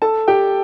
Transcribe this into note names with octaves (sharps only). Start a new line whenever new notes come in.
A4 A5
G4 G5